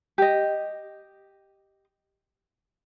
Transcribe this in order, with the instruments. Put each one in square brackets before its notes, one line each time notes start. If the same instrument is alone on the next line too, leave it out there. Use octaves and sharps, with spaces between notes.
[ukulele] G4 D#5